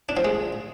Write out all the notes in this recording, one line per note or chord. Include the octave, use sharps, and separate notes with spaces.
D4
F3
G#3